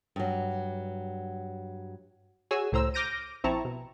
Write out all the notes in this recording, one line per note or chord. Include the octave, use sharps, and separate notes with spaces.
G2 F#3
F#4 G#4 C#5 G#5 E6
C#2 A2 C5 A#5 E6
D6 F6 G6 A#6 D7 D#7
A#1 C4 E4 A5 A#5 C#6
B2